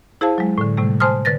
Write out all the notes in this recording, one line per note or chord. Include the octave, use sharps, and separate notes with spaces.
E4 G#4 C5 F5 A5
F#3 G#3
A2 D3
A2 C3 G3 A3
C5 G#5 A5 C6 D#6 F6
D3 B4 A6 A#6